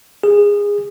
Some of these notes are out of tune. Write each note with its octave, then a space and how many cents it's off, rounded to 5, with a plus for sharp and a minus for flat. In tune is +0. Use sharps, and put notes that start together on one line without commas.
G#4 -20